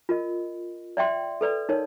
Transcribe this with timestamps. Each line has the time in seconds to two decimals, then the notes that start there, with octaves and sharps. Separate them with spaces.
0.09 F4 A#4 D#5
0.97 D5 E5 G5 C6
1.41 A4 B4 D5
1.69 D#4 A#4 C#5